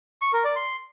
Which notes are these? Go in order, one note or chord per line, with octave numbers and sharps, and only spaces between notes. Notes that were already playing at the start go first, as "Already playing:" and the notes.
C#6
A#4
D5
C6